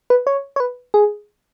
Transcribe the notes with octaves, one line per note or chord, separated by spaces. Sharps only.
B4
C#5
C#5
B4
G#4